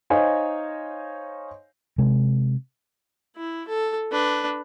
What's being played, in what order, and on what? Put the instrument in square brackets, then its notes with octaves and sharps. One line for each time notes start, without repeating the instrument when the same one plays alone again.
[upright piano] D#4 C5 C#5 D#5 F5 G#5
[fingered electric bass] C3 G#3
[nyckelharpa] E4
A4
D4 B4